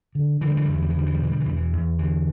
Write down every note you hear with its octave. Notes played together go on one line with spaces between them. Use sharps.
D3
D3 E3
G3
E3
E2 G3
E3
G3
E3
D3 G3
E3
G3
B2 E3
G3
E3
E2 G3
E3
E2
D3 E3